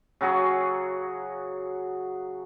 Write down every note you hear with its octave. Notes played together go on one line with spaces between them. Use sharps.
C#3 F#3 F#4 G#4